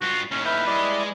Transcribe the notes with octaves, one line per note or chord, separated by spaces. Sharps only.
G2 F4 F#4
D#2 A2 C#4
B4 E5 F6 G6
G3 G#3 E4 D5 D#5